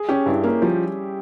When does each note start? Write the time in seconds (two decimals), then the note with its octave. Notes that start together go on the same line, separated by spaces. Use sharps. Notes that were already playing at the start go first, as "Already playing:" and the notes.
Already playing: G#4
0.09 C#4 G4
0.26 G2 E4
0.44 A#3 C#4
0.62 F3 G3